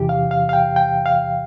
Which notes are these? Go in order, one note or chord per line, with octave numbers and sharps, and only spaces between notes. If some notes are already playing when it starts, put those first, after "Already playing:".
Already playing: E2 C3 E3 G4
F5
F5
F5
G5
G5
F5